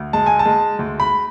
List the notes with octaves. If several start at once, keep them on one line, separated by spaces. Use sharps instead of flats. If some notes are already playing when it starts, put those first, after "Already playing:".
Already playing: D2
G#3 A5
G#5
A5
G#3
D2
B5